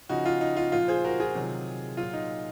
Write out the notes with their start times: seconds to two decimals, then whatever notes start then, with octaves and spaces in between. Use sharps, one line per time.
0.09 C#3 F3 D#4 F#4
0.25 F4
0.41 D#4
0.57 F4
0.72 A#2 F3 F4
0.88 G#4 C5
1.05 F#4 A#4
1.20 F4 G#4
1.35 C3 D#3 F#3
1.97 A#2 F#3 F4
2.13 D#4